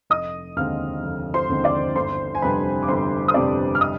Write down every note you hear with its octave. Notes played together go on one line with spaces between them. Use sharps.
F1 D#5 D#6
D#2 D3 G#3 C4 F5 F6
F1
C5 C6
D#2 D3 G#3 C4
D5 D6
G1 C5 C6
G#5
F2 C3 G3 D4 B4 B5
D6
G1 C5 C6
D#6
F2 C3 G3 D4 D5 D6
F6
D#5 D#6